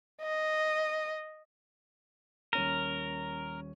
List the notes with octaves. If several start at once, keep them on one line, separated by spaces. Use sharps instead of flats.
D#5
D#1 C#4 A#4 D#7